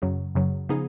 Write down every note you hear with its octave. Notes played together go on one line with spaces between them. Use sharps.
F#2 C#3 F#3
F#2 C#3 F#3
C#3 F3 B3 D#4 G#4